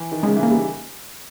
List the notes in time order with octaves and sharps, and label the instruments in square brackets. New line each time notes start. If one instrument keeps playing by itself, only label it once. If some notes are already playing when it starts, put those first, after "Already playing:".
Already playing: [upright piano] E3
D#3
[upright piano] C#3 [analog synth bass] G#3
[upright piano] E3
[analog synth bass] A#3
[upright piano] G3